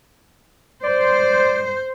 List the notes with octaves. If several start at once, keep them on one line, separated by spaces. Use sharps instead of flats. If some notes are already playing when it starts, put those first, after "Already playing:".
C5 D5